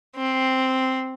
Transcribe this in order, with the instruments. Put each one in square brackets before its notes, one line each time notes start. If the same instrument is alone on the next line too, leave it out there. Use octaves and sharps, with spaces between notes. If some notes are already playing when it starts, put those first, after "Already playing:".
[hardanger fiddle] C4